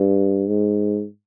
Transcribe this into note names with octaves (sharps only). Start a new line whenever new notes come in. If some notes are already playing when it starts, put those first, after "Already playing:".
Already playing: G2
G#2